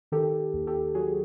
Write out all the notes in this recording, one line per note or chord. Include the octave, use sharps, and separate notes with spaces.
D#3 G4 A4
D#2
G4 A4
F#3 F#4 G#4